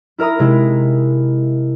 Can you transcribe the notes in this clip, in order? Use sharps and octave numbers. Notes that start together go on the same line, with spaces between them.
E4 A#4 E5 A#5 D#6
C3 G#3 E4